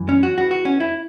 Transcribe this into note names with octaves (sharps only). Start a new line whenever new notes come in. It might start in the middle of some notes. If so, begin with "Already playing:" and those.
Already playing: F#2 E3
C#4
F#4
E2 E3 F#4
F#4
C#4
E4